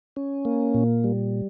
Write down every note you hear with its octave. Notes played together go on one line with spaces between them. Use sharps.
C#4
A#3
A#2
G3